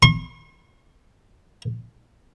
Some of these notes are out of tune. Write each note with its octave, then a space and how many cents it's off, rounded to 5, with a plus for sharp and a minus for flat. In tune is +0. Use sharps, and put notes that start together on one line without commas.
C#6 -45